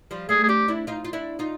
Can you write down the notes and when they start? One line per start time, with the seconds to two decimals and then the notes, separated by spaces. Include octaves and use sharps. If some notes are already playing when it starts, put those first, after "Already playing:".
0.11 F3 G3
0.29 G3 A3 G#4
0.44 G#4
0.48 C4 D4 G4
0.68 D4 E4
0.87 D#4 F4
1.05 F4
1.13 D4 E4
1.39 D#4 F4